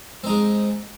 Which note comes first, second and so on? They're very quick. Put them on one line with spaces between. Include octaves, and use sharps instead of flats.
C4 D#4 G#3